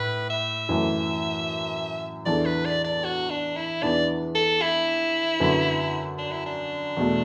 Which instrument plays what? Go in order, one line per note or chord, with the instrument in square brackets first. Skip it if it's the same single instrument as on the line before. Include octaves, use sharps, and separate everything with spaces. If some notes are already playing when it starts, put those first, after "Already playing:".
Already playing: [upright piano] A2 [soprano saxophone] B4
[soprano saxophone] E5
[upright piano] F#2 E3 A3
[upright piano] E2 E3 D4 A4 [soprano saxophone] D5
[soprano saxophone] B4
D5
D5
F#4
D4
E4
[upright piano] E2 E3 B3 D4 [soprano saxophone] D5
[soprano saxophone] A4
E4
[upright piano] F#2 D3 B3 F#4
[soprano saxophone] D4
E4
D4
[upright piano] E2 B2 A3